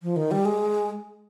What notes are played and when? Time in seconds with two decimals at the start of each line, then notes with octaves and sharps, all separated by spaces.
0.03 F3
0.16 D#3
0.31 G3
0.45 G#3